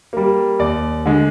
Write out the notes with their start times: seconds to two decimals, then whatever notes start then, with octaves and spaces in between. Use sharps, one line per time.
0.13 G3 A#3
0.59 D#2 D5
1.05 D3 G#3